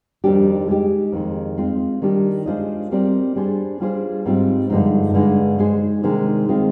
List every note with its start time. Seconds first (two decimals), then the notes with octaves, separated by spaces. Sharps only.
0.24 F2 D#3 G3 D4 G4
0.68 G#3 D#4 G4
1.12 F2 D#3 G#3
1.57 G#3 C4 F4
2.02 D#3 G3 D4 G4
2.46 G#3 D4 F4 C5 D#5
2.91 G3 C4 G4 A#4 D5
3.36 G3 D4 G#4 C5
3.80 G3 D4 F4 G#4 C5
4.25 G#2 G3 C4 F4
4.70 G2 D3 F3 G#3 D#4
5.13 G2 D3 G#3
5.59 G#3 D#4 G#4 C5
6.03 C3 D#3 G#3 D4
6.49 D#3 G#3 C4 F4